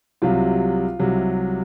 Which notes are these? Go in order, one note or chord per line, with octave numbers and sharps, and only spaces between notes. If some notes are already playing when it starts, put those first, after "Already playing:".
C2 C3 F#3 F4
C2 C3 F#3